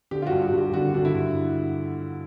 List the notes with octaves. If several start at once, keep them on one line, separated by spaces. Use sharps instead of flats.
D3 G4
F4
F#4
G2
G4
G2 G4
D3 F#4
D3
E4
G2